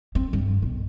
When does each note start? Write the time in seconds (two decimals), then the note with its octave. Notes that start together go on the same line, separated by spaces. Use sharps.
0.15 C4
0.33 G2
0.62 B1